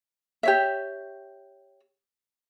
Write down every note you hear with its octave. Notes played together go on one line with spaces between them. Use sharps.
G4 C#5 E5